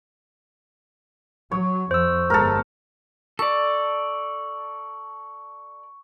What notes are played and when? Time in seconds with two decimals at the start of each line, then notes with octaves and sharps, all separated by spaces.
1.51 F#3 C#5
1.91 F2 C5 E6
2.30 G1 G#3 B3 A4 A#4
3.39 A4 D5 C#6